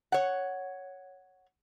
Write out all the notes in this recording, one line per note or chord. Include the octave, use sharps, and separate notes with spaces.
C#5 F#5